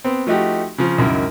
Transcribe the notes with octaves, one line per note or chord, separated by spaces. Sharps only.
B3 C4
F3 A3 D#4 F#4 G4
C#3 F3
C#2 F#2 D#3 E4 A#4